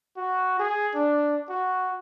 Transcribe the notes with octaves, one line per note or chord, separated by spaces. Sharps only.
F#4
G#4
D4
F#4